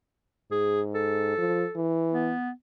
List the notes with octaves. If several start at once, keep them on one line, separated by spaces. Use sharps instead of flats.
G#2 G#4
A4
F3
E3
B3